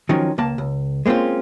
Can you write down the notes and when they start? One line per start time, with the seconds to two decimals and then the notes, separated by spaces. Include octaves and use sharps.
0.09 D#3 F3 F#3 C#4
0.38 C#2 A#3 A5
0.58 C#2
1.06 G#3 A#3 C4 C#4 F4